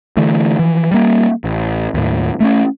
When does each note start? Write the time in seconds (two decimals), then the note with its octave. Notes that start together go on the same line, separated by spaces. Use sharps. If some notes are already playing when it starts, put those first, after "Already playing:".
0.17 D3 E3 A3
0.59 E3 F3
0.91 G3 A#3
1.44 A1
1.94 D#2 A2
2.40 A3 B3 C#4